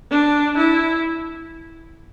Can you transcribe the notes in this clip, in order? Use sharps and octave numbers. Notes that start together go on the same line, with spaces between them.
D4
E4